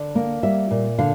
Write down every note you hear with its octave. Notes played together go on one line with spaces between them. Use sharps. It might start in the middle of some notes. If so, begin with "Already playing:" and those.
Already playing: D3 D5
A#3
G3 E5
A#2
D3 F5